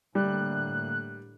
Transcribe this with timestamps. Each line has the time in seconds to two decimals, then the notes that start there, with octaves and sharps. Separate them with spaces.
0.15 A2 D3 G3 A#3 F#6